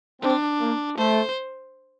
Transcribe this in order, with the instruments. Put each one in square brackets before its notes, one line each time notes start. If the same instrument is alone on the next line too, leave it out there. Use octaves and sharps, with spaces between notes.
[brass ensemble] C4 [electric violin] D4
[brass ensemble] A#3
[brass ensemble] A3 [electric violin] C5